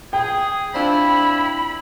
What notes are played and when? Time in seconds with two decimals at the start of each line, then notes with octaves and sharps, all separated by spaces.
0.13 G#4 G5
0.74 C4 D4 E4 F4 B5